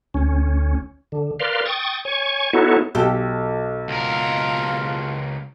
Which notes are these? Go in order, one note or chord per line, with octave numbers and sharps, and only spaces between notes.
D2 C#4
D3
A#4 B4 D5 F5 C6
G5 C#6 D#6 A6
C#5 G#5 C#6
B3 D#4 E4 F#4 A4 C#5
B1 G4 A4
C#2 F4 A#4